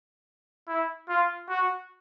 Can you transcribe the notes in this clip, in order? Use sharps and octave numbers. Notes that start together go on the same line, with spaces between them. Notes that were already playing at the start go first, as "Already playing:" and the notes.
E4
F4
F#4